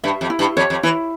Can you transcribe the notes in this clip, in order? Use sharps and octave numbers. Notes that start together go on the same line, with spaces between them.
G2 E5
F2
E4
G2
F2 C#5
F2
E3 E4